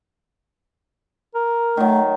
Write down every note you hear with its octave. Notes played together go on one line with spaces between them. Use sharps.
A#4
D#3 F#3 A3